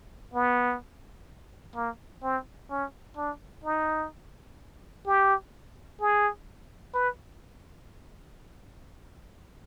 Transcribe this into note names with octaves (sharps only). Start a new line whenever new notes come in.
B3
A#3
C4
C#4
D4
D#4
G4
G#4
B4